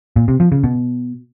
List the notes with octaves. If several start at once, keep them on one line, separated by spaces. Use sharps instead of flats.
A#2
C3
F3
C#3
B2